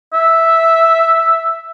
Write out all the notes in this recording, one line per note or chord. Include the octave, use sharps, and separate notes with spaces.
E5